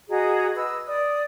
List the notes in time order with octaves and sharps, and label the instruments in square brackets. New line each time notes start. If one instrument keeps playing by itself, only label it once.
[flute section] F#4 G#4 D#5 A#5
B4 D#5 E6
D5 D#6